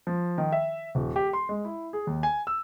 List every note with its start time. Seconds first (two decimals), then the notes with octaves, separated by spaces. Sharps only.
0.07 F3
0.38 D#3
0.52 E5
0.95 D#1
1.16 G4
1.33 C6
1.49 G#3
1.65 E4
1.93 G#4
2.07 D#2
2.23 G#5
2.47 E6